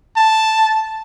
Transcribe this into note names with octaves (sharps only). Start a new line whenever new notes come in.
A5